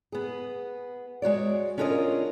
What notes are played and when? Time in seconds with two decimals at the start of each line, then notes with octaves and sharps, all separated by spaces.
0.12 B3 G#4
1.22 G#3 F#4 C#5 D5
1.78 C#4 D4 F4 A#4 C#5 D#5